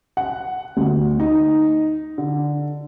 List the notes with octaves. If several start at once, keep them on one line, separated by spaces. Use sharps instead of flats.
F#5
D2
D#4
D3